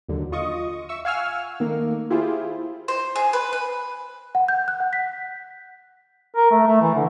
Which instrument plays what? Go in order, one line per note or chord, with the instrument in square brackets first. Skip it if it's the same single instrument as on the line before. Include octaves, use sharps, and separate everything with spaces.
[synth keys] D#2 D3 F#3
F4 D#5 C#6 D#6
E5 C#6 E6
F5 F#5 G#5 C#6 E6 F6
D#3 A3 A#3
E4 F4 G4 G#4 C5
[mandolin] C5
G#4
B4
B4
[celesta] F#5
G6
F#6
F#5
B6
[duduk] A#4
A3
A3
E3
D3